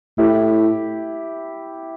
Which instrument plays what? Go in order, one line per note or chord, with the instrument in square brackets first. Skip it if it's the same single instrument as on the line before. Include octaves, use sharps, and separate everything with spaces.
[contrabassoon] A2 [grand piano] E4 G4